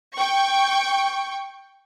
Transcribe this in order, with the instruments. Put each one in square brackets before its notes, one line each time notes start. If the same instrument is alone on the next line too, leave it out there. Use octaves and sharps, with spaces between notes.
[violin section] G5 C#6